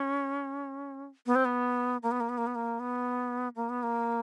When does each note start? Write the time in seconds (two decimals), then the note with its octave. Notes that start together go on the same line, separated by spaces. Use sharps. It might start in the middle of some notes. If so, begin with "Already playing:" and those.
Already playing: C#4
1.26 B3
1.35 C4
1.45 B3
2.03 A#3
2.11 B3
2.20 A#3
2.29 B3
2.38 A#3
2.47 B3
2.55 A#3
2.80 B3
3.56 A#3
3.69 B3
3.83 A#3